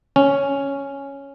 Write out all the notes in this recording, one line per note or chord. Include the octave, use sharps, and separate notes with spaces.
C#4